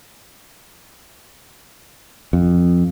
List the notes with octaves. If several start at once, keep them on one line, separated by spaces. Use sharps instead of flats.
F2